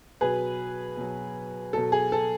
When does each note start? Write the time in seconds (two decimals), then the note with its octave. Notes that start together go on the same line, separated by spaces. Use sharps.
0.21 B2 F#3 G#4 B4
0.97 B2 F#3
1.73 B2 F#3 A4
1.92 G#4
2.12 A4